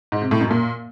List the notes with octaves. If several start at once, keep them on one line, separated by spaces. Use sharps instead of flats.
G#2
C3
A2
F#2
A#2